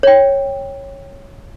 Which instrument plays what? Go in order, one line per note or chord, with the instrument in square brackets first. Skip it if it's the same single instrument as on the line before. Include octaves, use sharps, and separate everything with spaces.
[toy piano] C#5 G5